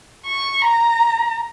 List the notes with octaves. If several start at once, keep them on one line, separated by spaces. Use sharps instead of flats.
C#6
A#5